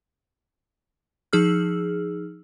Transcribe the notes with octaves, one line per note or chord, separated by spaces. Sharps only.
F3 D#4 G#4 E6 F6